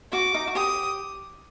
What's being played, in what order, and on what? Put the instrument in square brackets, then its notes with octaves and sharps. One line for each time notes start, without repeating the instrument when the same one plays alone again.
[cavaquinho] F#4 [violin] D6
[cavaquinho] D#4
F#4
[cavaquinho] G4 [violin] D#6